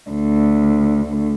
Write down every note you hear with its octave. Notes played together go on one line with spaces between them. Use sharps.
D2